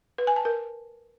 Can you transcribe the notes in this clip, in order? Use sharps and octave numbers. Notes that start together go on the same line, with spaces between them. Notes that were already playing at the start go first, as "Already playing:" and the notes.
B4
G#5
A5
A#4